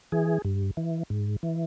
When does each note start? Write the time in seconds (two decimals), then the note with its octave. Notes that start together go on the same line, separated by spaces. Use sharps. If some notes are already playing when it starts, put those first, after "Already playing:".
0.12 E3 G#4
0.45 G2
0.77 E3
1.10 G#2
1.43 E3